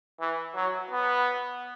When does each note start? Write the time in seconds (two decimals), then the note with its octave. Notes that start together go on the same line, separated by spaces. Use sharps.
0.20 E3
0.55 F#3
0.91 B3